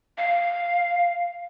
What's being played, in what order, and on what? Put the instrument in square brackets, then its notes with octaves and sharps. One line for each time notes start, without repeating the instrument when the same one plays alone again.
[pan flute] F5